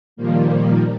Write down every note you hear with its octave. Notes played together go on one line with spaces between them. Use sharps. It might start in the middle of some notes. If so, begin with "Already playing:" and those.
A#2 D#3 F3 G3 A#3